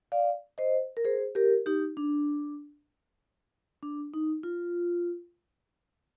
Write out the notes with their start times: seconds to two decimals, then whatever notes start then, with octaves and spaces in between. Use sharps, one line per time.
0.12 D5 F5
0.58 C5 D#5
0.97 A#4
1.05 G#4 C5
1.35 G4 A#4
1.66 D#4 G4
1.97 D4
3.83 D4
4.14 D#4
4.43 F4